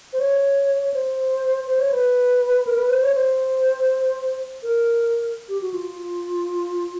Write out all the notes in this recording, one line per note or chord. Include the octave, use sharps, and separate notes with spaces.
C5
C#5
C5
C5
C#5
B4
A#4
B4
C5
C#5
C5
A#4
G4
F#4
F4